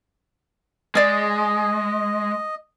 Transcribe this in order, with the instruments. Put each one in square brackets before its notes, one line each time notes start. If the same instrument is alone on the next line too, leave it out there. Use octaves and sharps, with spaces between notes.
[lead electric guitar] G#3 [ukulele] G#4 D5 [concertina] D#5